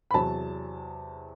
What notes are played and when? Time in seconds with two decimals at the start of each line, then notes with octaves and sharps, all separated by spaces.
0.11 B5
0.14 E2 C3 F#3 A5